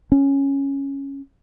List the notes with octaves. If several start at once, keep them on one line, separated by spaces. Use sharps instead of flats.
C#4